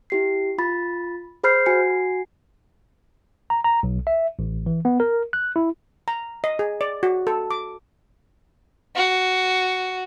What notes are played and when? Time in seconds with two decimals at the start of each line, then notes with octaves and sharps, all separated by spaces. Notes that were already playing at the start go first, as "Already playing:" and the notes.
0.10 E4 G4 C7
0.58 F4 B5 A6
1.43 G#4 C5 B5 F6 G6 C7
1.66 F#4 G#5 C7 C#7
3.50 A#5
3.64 A#5
3.83 B1
4.07 E5
4.39 A1
4.66 E3
4.85 B3
5.00 A#4
5.33 F#6
5.56 E4
6.08 A#5
6.44 D#5
6.59 G#4
6.81 D5
7.03 F#4
7.27 A4
7.51 D6
8.95 F#4